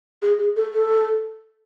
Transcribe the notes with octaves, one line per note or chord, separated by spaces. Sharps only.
G#4
G#4
A4
A4